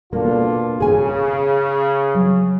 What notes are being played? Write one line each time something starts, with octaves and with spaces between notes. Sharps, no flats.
B2 A#3 D4 F4 A4
C#3 G#4 G#5
F#3